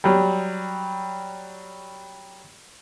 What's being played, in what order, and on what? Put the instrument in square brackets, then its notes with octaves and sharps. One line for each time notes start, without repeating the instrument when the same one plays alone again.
[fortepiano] F#3 G3